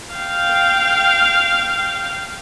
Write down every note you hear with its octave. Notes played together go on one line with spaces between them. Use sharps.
F5 G5